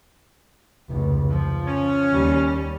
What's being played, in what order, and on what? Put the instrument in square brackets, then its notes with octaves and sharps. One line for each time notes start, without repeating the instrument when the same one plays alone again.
[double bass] F1 C#2
F3
[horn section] C#4
[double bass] D#2 G3